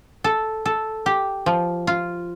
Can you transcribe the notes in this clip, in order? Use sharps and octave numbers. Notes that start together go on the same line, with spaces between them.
A4
A4
G4
F3
F4